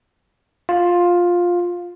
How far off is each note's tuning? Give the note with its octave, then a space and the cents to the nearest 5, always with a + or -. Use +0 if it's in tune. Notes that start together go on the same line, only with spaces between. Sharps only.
F4 +10